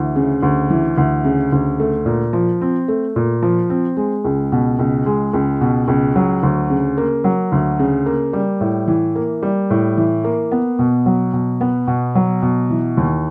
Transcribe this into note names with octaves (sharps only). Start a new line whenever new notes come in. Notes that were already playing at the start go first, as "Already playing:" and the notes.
Already playing: D2 E3
C#3
D2
E3
D2
C#3
D2
A3
A#2
F3
C4
A3
A#2
F3
C4
G#3
C#2
B2
C#2
G#3
C#2
B2
C#2
F#3
D2
C#3
A#3
F#3
D2
C#3
A#3
G3
A2
E3
A#3
G3
A2
E3
A#3
B3
B2
F#3
B2
B3
B2
F#3
B2
E3
D#2